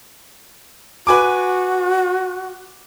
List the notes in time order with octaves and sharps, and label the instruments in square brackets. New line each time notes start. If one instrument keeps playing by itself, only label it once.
[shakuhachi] F#4 [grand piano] B4 G#5 D6